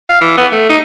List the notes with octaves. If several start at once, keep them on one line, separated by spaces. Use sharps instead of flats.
F5
E3
B3
A3
D#4